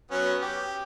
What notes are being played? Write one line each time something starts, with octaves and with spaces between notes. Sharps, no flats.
F#3 B3 C#4
G4